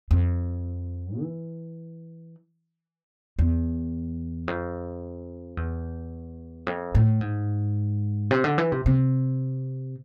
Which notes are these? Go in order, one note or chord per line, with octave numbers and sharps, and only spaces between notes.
F2
E3
E2
F2
E2
F2
A2
G#2
C3
D3
E3
C3
C3